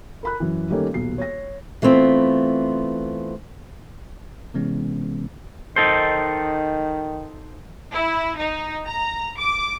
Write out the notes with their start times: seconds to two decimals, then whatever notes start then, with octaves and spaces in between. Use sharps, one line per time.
0.23 A#4 B5 F#6
0.40 F#2 E3
0.70 D#3 G3 A3 A#3 C#4
0.94 D#1 B1 C7
1.18 C#5 A#6
1.82 E3 A3 B3 C4 F4
4.54 C3 E3 G#3 B3 C#4
5.76 D#3 D#4 A4 C5
7.93 E4
8.38 D#4
8.86 A#5
9.38 D6